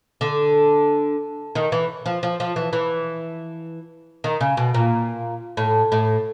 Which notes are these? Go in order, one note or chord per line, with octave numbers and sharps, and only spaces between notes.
D3
D#3
E3
F3
F3
F3
E3
E3
D#3
C#3
B2
A#2
A2
A2